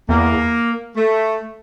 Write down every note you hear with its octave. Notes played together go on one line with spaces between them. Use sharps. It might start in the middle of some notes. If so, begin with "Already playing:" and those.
E2 A#3
A3